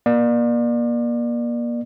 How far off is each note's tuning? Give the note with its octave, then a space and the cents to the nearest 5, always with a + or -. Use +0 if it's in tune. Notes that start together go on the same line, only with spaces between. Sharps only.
A#3 +30 D5 +30